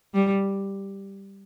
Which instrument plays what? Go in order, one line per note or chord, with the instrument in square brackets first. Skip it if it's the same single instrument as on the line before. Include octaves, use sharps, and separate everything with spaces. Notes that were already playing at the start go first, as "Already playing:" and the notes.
[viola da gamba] G3